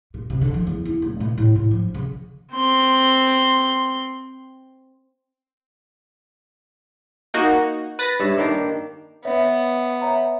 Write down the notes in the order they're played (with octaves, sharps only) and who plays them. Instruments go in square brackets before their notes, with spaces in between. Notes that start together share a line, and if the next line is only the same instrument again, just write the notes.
[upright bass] A#2
C3
D3
F3
E2
E4
D#1
A#2
A2
A2
F3
C#3
[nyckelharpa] C4 C6
[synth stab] A#3 D#4 F#4
B4 A6 A#6
[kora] G2 C#5 E5
D#3 A#3 D4
[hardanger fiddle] B3 [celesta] C#5 E5
[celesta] C#5 E5 A#5